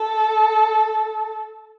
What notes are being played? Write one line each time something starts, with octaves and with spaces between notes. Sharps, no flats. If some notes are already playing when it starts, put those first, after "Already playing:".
Already playing: A4